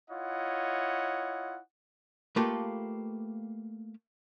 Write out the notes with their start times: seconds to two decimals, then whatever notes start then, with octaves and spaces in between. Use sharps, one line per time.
0.10 E4 F4 C#5 D#5 F#5
2.36 A3 A#3 F4 G4 A4 B4